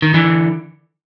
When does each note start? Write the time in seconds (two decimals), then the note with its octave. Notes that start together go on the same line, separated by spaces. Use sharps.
0.02 D#3
0.14 D3 E3